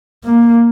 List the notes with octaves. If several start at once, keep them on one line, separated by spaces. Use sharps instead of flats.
A#3